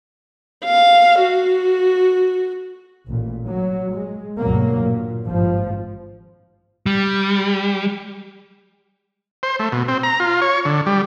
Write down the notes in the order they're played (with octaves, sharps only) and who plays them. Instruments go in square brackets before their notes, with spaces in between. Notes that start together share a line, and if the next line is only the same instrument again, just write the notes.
[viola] F5
F#4
[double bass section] A1 A#2
F#3
G#3
D2 G2 B2 F#3 A#3
A#2
G#1 G2 F3
[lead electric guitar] G3
[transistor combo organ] C5
A3
B2
C4
A#5
F4
C#5
D3
G3